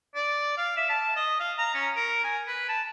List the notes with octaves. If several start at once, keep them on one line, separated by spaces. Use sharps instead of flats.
D5
F5
E5
A5
D#5
F5
A#5
C#4
A#4
G#5
B4
A5